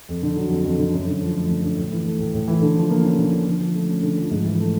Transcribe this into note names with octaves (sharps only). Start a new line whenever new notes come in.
F2
D3
F#3
F2
F2
D3
F#2
D3
F3
A3
F#2
D3
A2
E3
A3
A2
A2
E3
D3
F3
A#3
C#4
D3
F3
D3
F3
A3
C#4
D3
F3
G#2
E3
A3